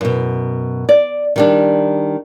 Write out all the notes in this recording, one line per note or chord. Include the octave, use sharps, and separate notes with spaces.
F#2 B2
D5
D#3 G3 D4